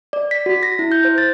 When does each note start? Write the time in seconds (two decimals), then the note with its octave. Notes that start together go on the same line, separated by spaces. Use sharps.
0.13 D5
0.31 B6
0.46 F#4
0.63 A#6
0.79 E4
0.92 G6
1.05 C5
1.18 A6